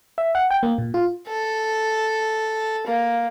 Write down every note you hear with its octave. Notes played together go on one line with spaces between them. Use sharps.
E5
F#5
G5
A#3
A#2
F4
A4
A#3